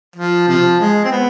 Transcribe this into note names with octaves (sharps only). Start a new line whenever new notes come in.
F3
C3 F3
G#3
C4
B3